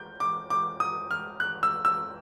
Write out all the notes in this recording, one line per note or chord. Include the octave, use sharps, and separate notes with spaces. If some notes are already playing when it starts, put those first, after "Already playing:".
Already playing: G6
D6
D6
D#6
F6
F#6
E6
E6